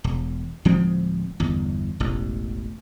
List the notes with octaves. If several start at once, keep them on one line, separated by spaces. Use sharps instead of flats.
E1
D1 F3 G#3 C4
G1 E2
E1 A1